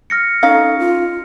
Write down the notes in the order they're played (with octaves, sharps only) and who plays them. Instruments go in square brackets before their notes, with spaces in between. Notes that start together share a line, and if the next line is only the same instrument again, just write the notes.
[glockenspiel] F6 A#6 C#7
[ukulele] C#4 D#4 F5 [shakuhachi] A4
[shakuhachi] F4